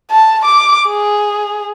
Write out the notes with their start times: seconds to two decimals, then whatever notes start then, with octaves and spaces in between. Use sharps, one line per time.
0.11 A5
0.45 D6
0.88 G#4